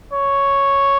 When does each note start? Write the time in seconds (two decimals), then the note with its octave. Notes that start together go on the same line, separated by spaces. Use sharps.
0.14 C#5